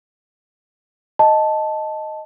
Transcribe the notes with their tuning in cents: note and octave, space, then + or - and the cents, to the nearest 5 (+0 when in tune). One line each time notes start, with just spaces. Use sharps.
D#5 +0 A5 -5